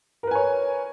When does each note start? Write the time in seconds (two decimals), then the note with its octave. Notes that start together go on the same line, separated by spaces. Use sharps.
0.23 A#4
0.27 B4
0.31 G#5
0.35 C#5